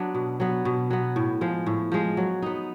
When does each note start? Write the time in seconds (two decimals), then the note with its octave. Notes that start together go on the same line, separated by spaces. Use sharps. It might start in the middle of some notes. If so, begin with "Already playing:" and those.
Already playing: F#3 B3 D4
0.15 B2
0.40 F#3 B3
0.65 B2
0.91 F#3 B3
1.16 A2
1.41 F3 G#3
1.67 A2
1.92 F3 G#3
2.17 F#3
2.42 B3 D#4